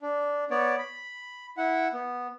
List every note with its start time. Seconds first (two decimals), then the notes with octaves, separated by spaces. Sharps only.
0.02 D4
0.50 B3 C#5 D5
0.79 B5
1.57 E4 F#5
1.93 B3